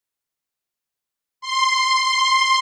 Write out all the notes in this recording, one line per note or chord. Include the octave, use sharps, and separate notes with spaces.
C6